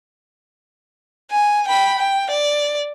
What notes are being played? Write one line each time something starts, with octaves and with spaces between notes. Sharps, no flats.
G#5
G5 B5
G5
D5